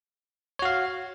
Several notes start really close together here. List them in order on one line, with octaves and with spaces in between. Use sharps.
C#5 F#4 F5